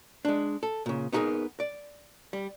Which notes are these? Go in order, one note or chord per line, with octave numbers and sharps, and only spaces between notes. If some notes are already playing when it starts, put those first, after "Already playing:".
G#3 D4
A4
A#2 C#3
B3 D#4 F4 G4 G#4 A#4
D5
G3